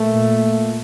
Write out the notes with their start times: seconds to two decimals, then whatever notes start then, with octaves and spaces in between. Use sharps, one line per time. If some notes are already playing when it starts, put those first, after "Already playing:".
Already playing: A#2 A3 A#3
0.14 A#2